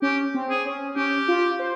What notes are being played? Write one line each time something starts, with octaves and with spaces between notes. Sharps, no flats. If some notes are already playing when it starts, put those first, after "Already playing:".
C#4 G4
C4
G#4
C#4
C#4 G4
F4
C5